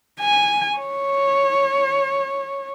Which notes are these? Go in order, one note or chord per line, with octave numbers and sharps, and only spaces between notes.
G#5
C#5